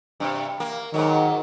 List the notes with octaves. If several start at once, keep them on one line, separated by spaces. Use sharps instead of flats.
G2 C3
A#3
G#2 D#3 F#3